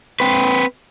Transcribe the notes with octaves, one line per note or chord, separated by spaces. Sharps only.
C4 B4